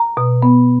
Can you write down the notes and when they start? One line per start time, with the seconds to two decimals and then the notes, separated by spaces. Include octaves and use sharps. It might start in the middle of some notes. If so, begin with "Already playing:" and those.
Already playing: A#5
0.17 B2
0.42 B3